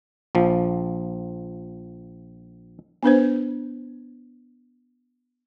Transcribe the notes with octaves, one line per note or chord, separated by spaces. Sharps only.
A#1 F3
B3 D4 B4 C5